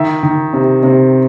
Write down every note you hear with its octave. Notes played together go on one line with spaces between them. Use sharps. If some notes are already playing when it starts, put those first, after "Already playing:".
Already playing: D#3 E5
D#3
C3
C3